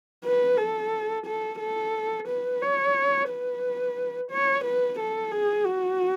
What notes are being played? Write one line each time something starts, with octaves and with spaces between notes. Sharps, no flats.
B4
A4
A4
A4
B4
C#5
B4
C#5
B4
A4
G#4
F#4